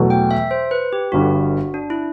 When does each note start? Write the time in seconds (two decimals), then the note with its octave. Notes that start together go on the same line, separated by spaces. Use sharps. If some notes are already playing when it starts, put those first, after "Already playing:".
Already playing: E2 B2 F#3 A3
0.10 G5
0.31 E5
0.51 C5
0.71 B4
0.93 G4
1.12 G1 G2 D3 F#4
1.74 D4
1.90 E4